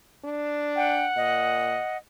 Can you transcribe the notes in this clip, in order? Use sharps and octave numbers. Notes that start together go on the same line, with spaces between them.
D4
F#5 G5
A#2 D#5